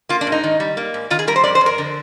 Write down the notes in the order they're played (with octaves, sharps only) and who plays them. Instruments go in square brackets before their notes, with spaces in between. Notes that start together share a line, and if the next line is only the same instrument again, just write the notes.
[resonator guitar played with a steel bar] A#3 F4
D4
G#2
D#4
D#3
G3
A#3
G#2
D#3 F4
G#4
G3 A#4
C5
F2 D5
C5
F2
A#4
D3